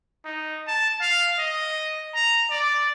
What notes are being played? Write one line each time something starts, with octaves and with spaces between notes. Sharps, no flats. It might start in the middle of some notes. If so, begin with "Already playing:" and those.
D#4
A5
F5
D#5
A#5
D5